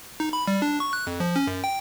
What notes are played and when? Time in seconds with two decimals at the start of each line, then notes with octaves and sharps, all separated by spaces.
0.20 D#4
0.33 B5
0.48 G3
0.62 D4
0.80 C#6
0.93 F#6
1.07 F2
1.20 F3
1.36 C#4
1.47 F#2
1.64 G5